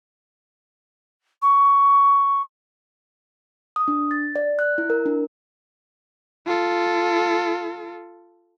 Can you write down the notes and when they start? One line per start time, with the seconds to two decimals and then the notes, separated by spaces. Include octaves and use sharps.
1.42 C#6
3.76 D#6
3.88 D4
4.11 A6
4.36 D5
4.59 F#6
4.78 E4
4.90 A#4
5.06 D4
6.46 F4 A4